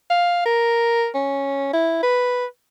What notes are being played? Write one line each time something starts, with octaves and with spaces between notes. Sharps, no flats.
F5
A#4
C#4
E4
B4